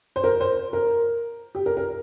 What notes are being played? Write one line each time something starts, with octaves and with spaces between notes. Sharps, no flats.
C5
A#4
C5
A#4
G4
A#4
A#4